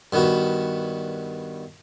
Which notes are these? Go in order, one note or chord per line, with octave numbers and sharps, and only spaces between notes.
G2 D#3 B3 F#4